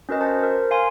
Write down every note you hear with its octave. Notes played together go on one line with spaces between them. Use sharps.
C#4 F#4 A#4 B4 D#5
C5 A5
A#4 C5
F5 G#5 C6